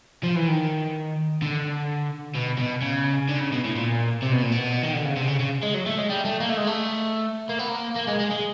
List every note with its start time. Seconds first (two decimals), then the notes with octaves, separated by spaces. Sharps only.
0.23 F3
0.36 E3
0.48 D#3
1.42 D3
2.35 B2
2.58 B2
2.82 C#3
3.29 D3
3.40 C#3
3.52 B2
3.64 A2
3.76 A#2
4.22 C3
4.32 B2
4.42 A#2
4.52 B2
4.83 D#3
4.93 D3
5.05 C#3
5.16 C3
5.27 C#3
5.40 C#3
5.63 G#3
5.74 F#3
5.86 A3
5.98 G#3
6.09 G3
6.25 A3
6.41 A#3
6.49 A3
6.57 G#3
6.67 A3
7.49 A#3
7.59 B3
7.69 A#3
7.96 A#3
8.08 G#3
8.20 G#3
8.32 G#3